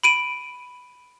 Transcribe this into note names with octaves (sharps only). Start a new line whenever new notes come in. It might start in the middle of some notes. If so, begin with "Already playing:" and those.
B5 D7 D#7